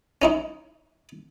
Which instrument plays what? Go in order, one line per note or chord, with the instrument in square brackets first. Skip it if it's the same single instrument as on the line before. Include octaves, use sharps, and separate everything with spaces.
[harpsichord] C#4 D#4 E4